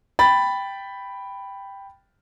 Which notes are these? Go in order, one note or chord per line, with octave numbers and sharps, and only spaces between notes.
G5 B5 A6